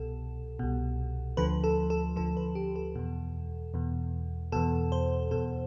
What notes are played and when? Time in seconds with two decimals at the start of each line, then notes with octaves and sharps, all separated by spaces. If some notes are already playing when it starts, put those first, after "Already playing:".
Already playing: C2 B2 A4
0.59 C2 B2
1.37 D2 D3 F3 B4
1.64 A4
1.90 A4
2.16 D2 D3 F3 A4
2.37 B4
2.55 G4
2.76 A4
2.95 E2 B2
3.74 E2 B2
4.52 E2 B2 A4
4.92 C5
5.31 E2 B2 A4